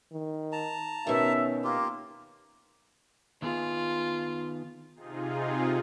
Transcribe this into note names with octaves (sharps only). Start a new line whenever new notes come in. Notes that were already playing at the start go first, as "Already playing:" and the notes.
D#3
A5 A#5
B2 D#3 C#4 E5
A#3 F4 G4
D#3 B3 F4 G#4
C3 D#4 F4 G#4